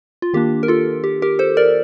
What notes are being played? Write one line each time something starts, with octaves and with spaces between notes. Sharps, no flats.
F4
D#3 A#3 D4 G4
A#4
F4 A4
G4
G4 A#4
A4 C5
A#4 D5